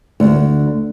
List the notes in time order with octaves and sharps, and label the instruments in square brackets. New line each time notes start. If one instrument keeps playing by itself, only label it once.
[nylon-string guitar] D2